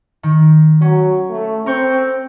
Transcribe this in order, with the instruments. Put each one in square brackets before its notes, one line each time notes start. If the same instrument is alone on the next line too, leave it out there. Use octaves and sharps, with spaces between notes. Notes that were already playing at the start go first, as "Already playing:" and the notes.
[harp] D#3
[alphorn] F#3 [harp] C#4
[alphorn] A3
[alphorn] C4 [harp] A#4 C#6 G6